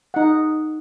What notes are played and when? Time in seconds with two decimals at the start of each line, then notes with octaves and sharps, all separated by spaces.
0.14 D#4 F#5